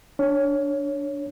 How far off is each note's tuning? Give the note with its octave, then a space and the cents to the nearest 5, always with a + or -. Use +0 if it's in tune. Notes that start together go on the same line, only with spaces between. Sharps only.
D4 +0 C#5 +0